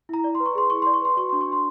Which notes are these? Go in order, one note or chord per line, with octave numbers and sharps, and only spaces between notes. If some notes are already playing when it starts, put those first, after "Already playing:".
E4 A#5
D5
C6
B4
C#6
G#4 C6
E4 C#6
D5 C6
C#6
B4 C6
F#4 C#6
D4 C6
C#6
D4 C6